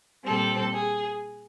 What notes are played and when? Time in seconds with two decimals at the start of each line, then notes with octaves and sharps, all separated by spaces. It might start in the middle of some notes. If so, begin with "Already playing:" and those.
0.25 A#2 G3 C4 A4
0.72 G#4